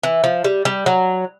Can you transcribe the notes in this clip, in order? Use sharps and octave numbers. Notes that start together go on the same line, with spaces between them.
E3
F3
G3
G3
F#3